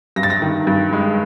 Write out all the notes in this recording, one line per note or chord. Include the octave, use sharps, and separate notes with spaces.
G2 A#6
A6
A#6
D#3
G2
G#3